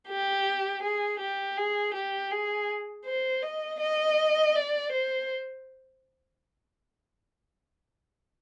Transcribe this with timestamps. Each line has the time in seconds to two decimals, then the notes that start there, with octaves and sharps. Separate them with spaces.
0.08 G4
0.83 G#4
1.20 G4
1.58 G#4
1.94 G4
2.31 G#4
3.06 C5
3.43 D#5
3.80 D#5
4.55 D5
4.92 C5